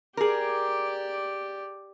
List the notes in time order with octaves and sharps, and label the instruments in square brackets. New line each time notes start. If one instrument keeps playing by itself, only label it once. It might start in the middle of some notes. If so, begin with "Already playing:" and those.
[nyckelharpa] G4 D5 [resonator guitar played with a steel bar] G#4 A#4